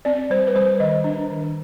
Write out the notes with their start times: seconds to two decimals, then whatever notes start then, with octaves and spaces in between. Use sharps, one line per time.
0.05 C4 D5
0.30 G3 C5
0.47 B4
0.55 G3 C5
0.80 D#3 D#5
1.04 D4
1.30 D#3